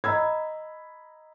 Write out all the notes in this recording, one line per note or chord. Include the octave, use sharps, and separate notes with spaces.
D#5 A#5 B5 E6 G#6